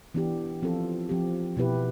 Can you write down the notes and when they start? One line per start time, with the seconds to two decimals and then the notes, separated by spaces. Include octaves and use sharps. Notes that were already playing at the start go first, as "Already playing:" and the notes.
0.14 E3 B3 D4 G4
0.62 F3 C4 F4 A4
1.09 F3 C4 G4
1.57 B2 B3 E4 G4 B4